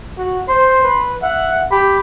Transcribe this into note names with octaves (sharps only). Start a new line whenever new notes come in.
F#4
C5 C6
B4
E5 F#5
G4 B5